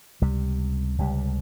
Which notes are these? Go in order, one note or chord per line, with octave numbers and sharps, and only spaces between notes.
C#2 C3 G3
C#2 C3 G3